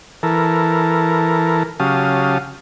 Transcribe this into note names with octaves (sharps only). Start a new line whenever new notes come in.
E3 A4 A#4
C#3 F#3 G4 F5 A5 D#6